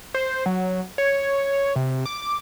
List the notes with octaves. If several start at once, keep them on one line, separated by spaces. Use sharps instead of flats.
C5
F#3
C#5
C3
D6